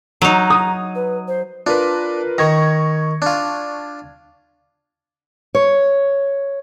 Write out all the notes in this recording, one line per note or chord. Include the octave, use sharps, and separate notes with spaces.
F#3 D#4 A#5
D#6
B4
C5
D4 F4 A#4 B4
D#3 C#6 G#6 A#6
D4 F4
C#5